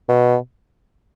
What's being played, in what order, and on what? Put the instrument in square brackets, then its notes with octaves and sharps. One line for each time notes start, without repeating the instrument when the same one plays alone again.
[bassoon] B2